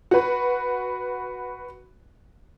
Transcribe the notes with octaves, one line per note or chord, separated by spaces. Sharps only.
F#4 B4